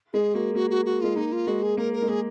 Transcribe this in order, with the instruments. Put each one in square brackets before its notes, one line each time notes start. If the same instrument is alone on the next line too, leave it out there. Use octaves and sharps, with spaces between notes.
[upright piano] G#3 [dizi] G#4
[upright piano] A#3 [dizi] F#4
[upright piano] A#3 [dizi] F#4
[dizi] F#4
F#4
[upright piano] G#3 [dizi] F4
[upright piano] A#3 [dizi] D#4
[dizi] F4
[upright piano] G#3 [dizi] F#4
[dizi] G#4
[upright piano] A#3 [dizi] A#4
[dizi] A#4
[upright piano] G#3
[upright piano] A#3 [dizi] G#4